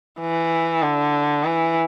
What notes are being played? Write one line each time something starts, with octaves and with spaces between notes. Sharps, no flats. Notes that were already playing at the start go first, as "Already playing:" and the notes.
E3
D3
E3